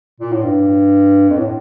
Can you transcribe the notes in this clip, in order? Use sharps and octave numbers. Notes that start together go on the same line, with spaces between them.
A#2
A2
G2
F2
A2